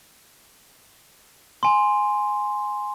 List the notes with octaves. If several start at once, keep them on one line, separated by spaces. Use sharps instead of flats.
G#5 C6